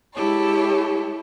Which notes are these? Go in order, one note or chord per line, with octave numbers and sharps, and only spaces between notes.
G#3 E4 G4 A4 C#5